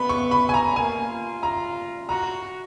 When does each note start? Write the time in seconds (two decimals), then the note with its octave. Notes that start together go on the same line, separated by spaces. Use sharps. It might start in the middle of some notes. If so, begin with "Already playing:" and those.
Already playing: B3 B5
0.09 C#6
0.31 B5
0.49 G#5
0.54 A#5
0.76 A#3 G#5
1.10 F4
1.43 A#5
2.09 F#4 A#5